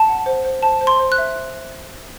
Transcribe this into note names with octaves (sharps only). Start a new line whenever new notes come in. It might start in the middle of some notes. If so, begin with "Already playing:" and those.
Already playing: A5
F#5
C5
C5
C5 A5
C5
C6
C5
F#6
E5